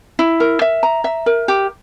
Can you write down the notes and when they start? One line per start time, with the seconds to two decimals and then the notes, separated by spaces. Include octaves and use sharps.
0.19 E4
0.40 A#4
0.62 E5
0.83 A#5
1.04 E5
1.26 A#4
1.48 G4